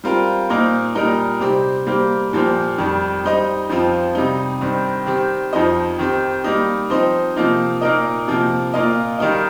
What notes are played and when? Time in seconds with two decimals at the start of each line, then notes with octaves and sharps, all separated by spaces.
0.04 G3 C4 F4 A#4
0.49 A#2 A#3 D#4 C5
0.95 A#2 G3 D#4 A#4
1.40 C3 G3 C4 G4
1.87 G3 A#3 G4 C5
2.33 A#2 F3 A#3 G4 C5
2.78 F2 D#3 G3
3.24 G3 D#4 C5 D#5
3.69 F2 F3 C4 F4
4.15 C3 G3 D#4
4.61 G2 D#3 C4
5.06 D#3 C4 G4
5.53 F2 F3 D#4 C5 D#5
5.99 D#3 C4 G4
6.44 G3 A#3 D#4
6.90 F3 C4 D#4 C5
7.36 C3 F3 A#3 D#4
7.81 A#2 A#3 D#4 A#4 D#5
8.27 C3 F3 A#3
8.74 A#2 A#3 F4 A#4 D#5
9.18 D#3 G3 D#4 A#4 D#5